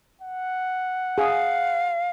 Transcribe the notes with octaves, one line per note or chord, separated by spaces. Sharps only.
F#5
G#4 F5